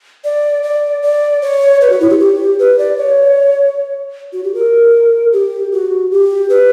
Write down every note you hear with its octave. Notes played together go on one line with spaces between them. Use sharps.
D5
D5
D5
C#5
B4
F#4
E4
G4
G4
B4
D5
C#5
F#4
G4
A#4
G4
F#4
G4
B4